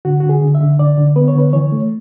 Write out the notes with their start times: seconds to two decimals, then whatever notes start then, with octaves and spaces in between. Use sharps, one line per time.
0.05 D3 F#4
0.20 D3 F#4
0.29 G#4
0.42 D3
0.55 E5
0.61 D3
0.79 D3 D5
0.98 D3
1.16 B3 B4
1.28 C#5
1.35 D3 B4
1.53 E3 C#5
1.72 A3